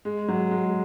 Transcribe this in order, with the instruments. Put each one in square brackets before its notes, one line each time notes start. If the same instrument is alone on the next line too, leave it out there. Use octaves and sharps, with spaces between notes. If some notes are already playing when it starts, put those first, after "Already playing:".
[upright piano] G#3
F#3
G#3